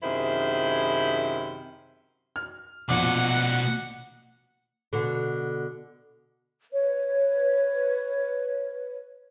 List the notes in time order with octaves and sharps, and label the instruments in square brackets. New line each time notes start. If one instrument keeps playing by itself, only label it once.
[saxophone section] F#2 C3 D#3 E4 G#4 C5
[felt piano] F6
[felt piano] A#1 F3 D6 [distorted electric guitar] B2 D5 [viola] F#5
[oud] B2 D3
[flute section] B4 C#5